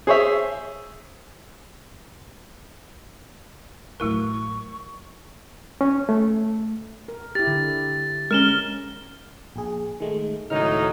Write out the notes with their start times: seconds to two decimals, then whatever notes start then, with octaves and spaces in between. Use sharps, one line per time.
0.07 G#4 C5 C#5 E5
4.00 A1 F#3 A3 E4 A#4 C#6
5.81 C#4
6.09 A3
7.08 A#4
7.35 E4 G4 A6
7.47 D3
8.31 G#3 C#4 A#4 F6 E7 G7
9.56 A#1 G#4
10.00 D#3 G#3 A3
10.50 C#2 A2 D#3 F#3 D#4 F6